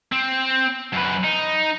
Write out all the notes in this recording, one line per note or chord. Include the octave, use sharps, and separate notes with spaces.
C4
F#2 B4
D#4